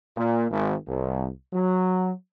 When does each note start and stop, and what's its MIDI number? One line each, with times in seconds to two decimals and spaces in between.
0.16 0.46 46
0.51 0.75 32
0.87 1.27 36
1.53 2.12 54